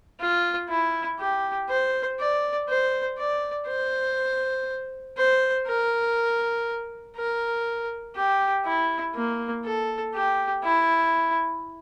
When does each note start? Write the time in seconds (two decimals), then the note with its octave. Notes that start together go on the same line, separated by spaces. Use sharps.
0.20 F4
0.70 E4
1.20 G4
1.69 C5
2.19 D5
2.69 C5
3.18 D5
3.68 C5
5.17 C5
5.67 A#4
7.16 A#4
8.16 G4
8.65 E4
9.15 A#3
9.65 A4
10.14 G4
10.64 E4